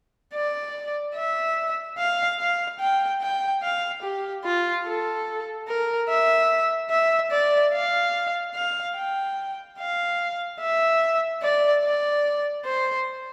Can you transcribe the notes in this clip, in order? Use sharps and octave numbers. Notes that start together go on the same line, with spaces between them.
D5
E5
F5
F5
G5
G5
F5
G4
F4
A4
A#4
E5
E5
D5
F5
F5
G5
F5
E5
D5
D5
C5